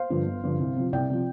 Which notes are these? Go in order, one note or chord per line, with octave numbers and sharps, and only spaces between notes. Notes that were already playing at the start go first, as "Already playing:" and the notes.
Already playing: C5 F5
G2 D3 F3
G1
G2 D3 F3
C2
C3 F3
C2 D5 G5
C3 F3